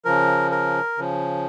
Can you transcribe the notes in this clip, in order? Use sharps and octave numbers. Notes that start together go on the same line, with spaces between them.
C#3 F3 A#4
A#4
C#3 F3